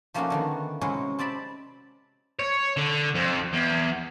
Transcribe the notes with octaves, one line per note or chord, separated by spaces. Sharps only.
F3 A3 A#3 C#4 D#4 F#4
D3 D#3 B3
C3 F#3 G#3 C#4 E4
C4 D5 A5 B5
C#5
D3
F2
E2